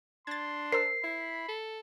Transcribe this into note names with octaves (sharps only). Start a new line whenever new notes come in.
D4 C6 G#6 A6
A#4 C5 E6 C7
E4 B5
A4